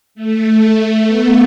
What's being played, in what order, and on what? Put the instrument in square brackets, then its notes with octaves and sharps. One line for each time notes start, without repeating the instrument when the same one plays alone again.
[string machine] A3
B3